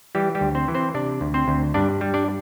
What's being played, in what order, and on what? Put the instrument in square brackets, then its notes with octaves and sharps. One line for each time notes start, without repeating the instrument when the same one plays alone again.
[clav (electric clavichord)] E3 G3 G4
G3 G4
D2
C4 C5
E3
C4 C5
C3 D4 D5
D2
C4 C5
D2
G2 D4 D5
G3
D4 D5